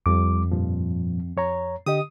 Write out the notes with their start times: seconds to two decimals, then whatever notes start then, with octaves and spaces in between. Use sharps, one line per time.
0.06 F2 G3 D6
0.52 G2 A#2 F3
1.37 F2 C#5 A#5
1.86 D3 G4 D#5 D#6